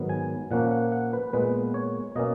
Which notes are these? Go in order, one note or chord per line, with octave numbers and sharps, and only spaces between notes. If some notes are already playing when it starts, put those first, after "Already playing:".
Already playing: G#2 D#3 F#3 B3
G#5
A#2 F3 A#3 C#4 F#5
F#5
F#5
B4
A#2 G#3 B3 B4
C#5
B2 A#3 C#4 D#5